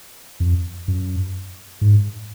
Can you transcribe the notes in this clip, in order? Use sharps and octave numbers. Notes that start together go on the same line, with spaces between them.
F2
F#2
G#2